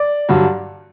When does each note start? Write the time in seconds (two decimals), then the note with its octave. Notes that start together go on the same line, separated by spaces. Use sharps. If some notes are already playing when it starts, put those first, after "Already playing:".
Already playing: D5
0.29 G2 D3 F#3